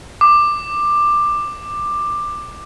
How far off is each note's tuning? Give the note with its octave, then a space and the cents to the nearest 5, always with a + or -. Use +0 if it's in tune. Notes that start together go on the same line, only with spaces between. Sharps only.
D6 +15